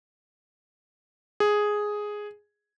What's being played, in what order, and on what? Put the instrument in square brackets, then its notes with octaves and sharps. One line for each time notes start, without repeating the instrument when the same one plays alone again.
[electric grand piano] G#4